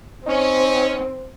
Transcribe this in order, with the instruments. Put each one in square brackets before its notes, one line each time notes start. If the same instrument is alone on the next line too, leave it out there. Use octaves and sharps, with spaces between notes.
[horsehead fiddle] C4 [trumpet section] C#4 [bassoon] D#4